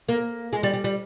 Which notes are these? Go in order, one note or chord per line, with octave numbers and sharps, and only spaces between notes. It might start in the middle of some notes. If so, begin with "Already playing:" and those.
A#3
G#3
G3
G3
G3